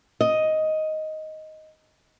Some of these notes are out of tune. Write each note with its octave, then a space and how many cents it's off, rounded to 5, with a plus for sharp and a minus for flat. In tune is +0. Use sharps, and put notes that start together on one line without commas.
D#5 +5